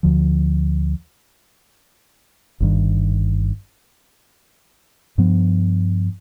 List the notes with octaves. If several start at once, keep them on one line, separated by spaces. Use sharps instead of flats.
D2 D3 F3
G1 G2 D#3
G2 F3 B3